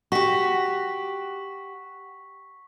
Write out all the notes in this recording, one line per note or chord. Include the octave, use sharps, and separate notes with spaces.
F#4 G4 C#6 B6